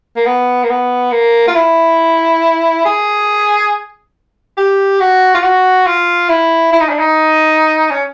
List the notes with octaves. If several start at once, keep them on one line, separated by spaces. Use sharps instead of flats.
A#3
B3
A#3
B3
A#3
F4
E4
G#4
G4
F#4
F4
F#4
F4
E4
E4
D#4
D4
D#4
C#4